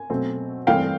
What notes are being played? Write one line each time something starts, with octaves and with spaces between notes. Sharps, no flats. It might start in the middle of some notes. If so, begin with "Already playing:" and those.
Already playing: G#5
B2 F#3 A3 C4
G2 E3 A3 C4 F5 G5